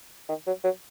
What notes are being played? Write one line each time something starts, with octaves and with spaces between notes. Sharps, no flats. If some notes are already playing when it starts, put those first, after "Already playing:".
D#3
F#3
F#3